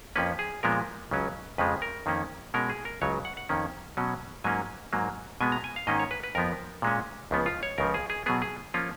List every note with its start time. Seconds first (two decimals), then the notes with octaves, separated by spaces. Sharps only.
0.16 F2 F3 A#3 C#4 B4
0.39 G#4
0.63 A#2 F3 G#3 B3 A#4
1.11 C#2 C#3 F#3 C#4
1.58 F2 C#3 F3 G#3 B4
1.82 A#4
2.06 F2 D#3 A#3 C#4
2.54 B2 G#3 C#4 A#4
2.70 G#4
2.85 A#4
3.02 C#2 C#3 F#3 C#5
3.25 F#5
3.37 F#5
3.49 F2 D#3 A#3 C#4
3.97 B2 F#3 C#4
4.44 G#2 F#3 A#3 C#4 G#5
4.93 G#2 F#3 A#3
5.41 B2 G#3 B3 G#5
5.52 A#5
5.64 G#5
5.76 F5
5.87 G#2 D#3 A#3 C#4 D#5
5.99 C#5
6.11 B4
6.23 B4
6.35 F2 F3 B3 A#4
6.82 A#2 G#3 C#4
7.31 C#2 C#3 F3 B3
7.46 F4
7.63 C#5
7.78 C#2 C#3 F3 A#4
7.94 G#4
8.10 G#4
8.26 B2 F#3 B3 G#4
8.42 G#4
8.74 F3 A#3 C#4 F4